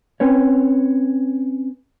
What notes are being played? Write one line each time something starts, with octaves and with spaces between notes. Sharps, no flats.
C4 C#4 B4 C#5